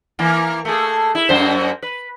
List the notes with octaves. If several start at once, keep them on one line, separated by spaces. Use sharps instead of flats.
E3 A#3
A3 A#3 G#4
E4
F#2 A#3 C5
B4